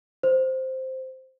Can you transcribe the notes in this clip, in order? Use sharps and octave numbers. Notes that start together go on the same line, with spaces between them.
C5